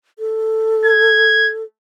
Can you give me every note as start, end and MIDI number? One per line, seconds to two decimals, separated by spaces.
0.19 1.63 69
0.85 1.49 92